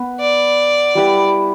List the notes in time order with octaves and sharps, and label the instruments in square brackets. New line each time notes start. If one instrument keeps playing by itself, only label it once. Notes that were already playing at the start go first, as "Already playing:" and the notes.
Already playing: [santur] B3 B4
[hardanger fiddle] D5
[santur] G3 E4 G4 B4